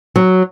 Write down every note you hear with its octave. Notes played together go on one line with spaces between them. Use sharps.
F#3